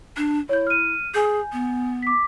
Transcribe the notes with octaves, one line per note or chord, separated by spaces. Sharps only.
D4
E4 C#5 G6
F6 D#7
G#4 G#5 G6
B3
D6 B6